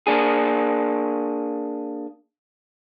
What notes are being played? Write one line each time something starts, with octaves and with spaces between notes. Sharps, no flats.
A#3 D4 G#4